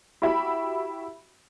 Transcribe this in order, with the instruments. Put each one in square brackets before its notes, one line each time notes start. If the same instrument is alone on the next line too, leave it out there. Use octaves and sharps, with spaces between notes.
[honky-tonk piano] E4 F#4 G4 E5 B5